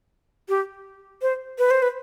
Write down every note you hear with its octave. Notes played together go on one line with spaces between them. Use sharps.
G4
C5
B4
C5
B4